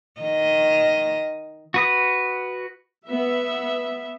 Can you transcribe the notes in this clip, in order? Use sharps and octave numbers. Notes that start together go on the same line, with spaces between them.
D#3 D#5
F#4 B4 D#6
B3 E5